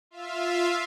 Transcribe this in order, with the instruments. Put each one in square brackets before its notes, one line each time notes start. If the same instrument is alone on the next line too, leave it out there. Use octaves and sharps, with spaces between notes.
[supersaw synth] F4 E5 F5